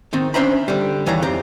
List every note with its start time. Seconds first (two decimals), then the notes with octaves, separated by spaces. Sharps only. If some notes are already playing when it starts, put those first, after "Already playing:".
0.13 D#3 C4 D#4
0.34 C#4 D4 C5 E5 A#5 B5
0.68 D3 G3
1.06 D#2 E3 C#5 F5 A#5
1.22 F2 C4 G4 A#5